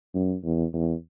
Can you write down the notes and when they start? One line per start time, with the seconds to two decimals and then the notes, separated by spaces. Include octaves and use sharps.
0.14 F#2
0.44 E2
0.73 E2